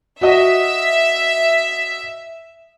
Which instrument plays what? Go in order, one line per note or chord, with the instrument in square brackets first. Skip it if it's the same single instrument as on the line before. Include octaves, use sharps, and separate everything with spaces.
[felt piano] F#4 D#5 [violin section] E5